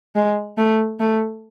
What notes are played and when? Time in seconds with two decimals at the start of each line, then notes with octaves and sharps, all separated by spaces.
0.15 G#3
0.58 A3
1.00 A3